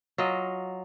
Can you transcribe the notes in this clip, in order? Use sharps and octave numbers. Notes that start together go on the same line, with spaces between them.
F#3 F4 D#5